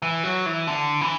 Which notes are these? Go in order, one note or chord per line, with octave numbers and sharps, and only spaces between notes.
E3
F#3
E3
D3
E3